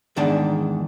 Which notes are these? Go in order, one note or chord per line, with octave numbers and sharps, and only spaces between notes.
E2 G#2 D#3 D4 A5